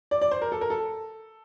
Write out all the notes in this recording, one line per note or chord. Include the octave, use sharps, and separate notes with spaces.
D5
D5
C5
A#4
A4
A#4
A4